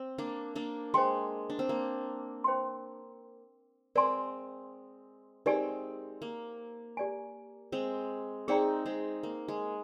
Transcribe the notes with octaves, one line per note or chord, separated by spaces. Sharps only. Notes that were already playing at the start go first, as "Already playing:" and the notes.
Already playing: C4
A#3 D4
A#3 D4
G#3 C5 G5 C6
D4
C4
A#3
C5 G5 C6
G#3 C4 A#4 D5 G#5 C6
G#3 C4 D#4 G4 A#4 D5 G#5
A#3
G4 D5 G#5
G#3 C4
C4 D#4 G#4 D5 G5 A#5
G#3 C4
A#3
G#3